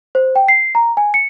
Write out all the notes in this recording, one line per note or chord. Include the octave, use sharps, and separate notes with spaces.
C5
G5
C7
A#5
G#5
C#7